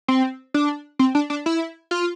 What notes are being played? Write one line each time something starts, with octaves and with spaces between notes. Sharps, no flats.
C4
D4
C4
D4
D4
E4
F4